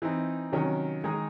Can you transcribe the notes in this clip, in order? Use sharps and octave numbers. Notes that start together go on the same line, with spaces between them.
E3 C4 D#4
C3 D#3 F#3 C#4
D#3 G#3 D#4 G#4